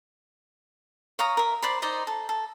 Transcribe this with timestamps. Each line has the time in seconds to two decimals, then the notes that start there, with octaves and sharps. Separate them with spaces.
1.19 C#5 F5 A#5 D#6
1.37 A#4 E5
1.62 C5 D5 B5 C6
1.82 D#4 C5 D5 D#5
2.07 A4
2.29 A4